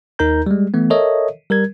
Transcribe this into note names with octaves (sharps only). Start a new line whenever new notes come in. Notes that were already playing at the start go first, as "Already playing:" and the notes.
D#2 D#4 A#4 A#5 G6
G3 G#3
E3 A3 B3
A4 A#4 C#5 D#5 E5
G3 A#4 G#6